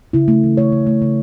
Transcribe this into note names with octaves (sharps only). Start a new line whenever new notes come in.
C#3 E4
A3
E3
A3 C#5
C#3
A3
C#3